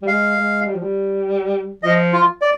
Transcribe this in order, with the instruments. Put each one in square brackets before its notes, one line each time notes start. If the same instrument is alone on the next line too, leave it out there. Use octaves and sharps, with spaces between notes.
[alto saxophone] G3
[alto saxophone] G#3 [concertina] F5
[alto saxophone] G#3
G3
F3
G3
[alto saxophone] F3 [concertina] D#5
[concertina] F4
D5